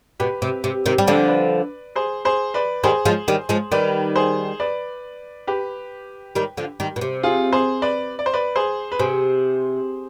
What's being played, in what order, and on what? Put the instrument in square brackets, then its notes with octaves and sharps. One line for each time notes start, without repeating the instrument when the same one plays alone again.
[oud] B2 [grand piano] G4 B4
[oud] C3
C3
C3 D#3
G3
[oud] D3 F3 [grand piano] D5
[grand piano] B4 D5
G#4 C5
G#4 C5
B4 D5
[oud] D#3 G3 [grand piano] G#4 C5
[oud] F3 G#3
D#3 G3
F3 G#3
[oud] D#3 G3 [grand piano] B4 D5
[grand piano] G#4 C5
B4 D5
G4 B4
[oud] D#3 G3
D3 F3
D#3 G3
B2
C3
[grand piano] F4 G#4
G#4 C5
B4 D5
D5
C5
B4 D5
G#4 C5
B4
[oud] C3 [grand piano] G#4 C5